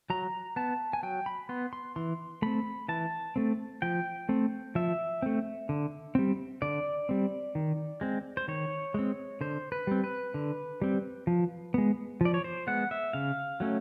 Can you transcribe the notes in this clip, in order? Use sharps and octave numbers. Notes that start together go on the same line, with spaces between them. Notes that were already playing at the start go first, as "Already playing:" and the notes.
F#3 A#5
B3 A5
G#5
F#3 G5
B5
B3 C6
C6
E3 C6
A3 C4 B5
E3 A5
A3 C4
F3 G5
A3 C4
F3 E5
A3 C4
D3
G3 C4
D3 D5
G3 C4
D#3
G#3 C4
C5
D#3 C#5
G#3 C4
D3 C5
B4
G3 C4
B4
D3
G3 C4
F3
G#3 B3
F3 D5
C#5
C5
G#3 B3 F#5
E5
C#3 F5
F#3 A3 C#4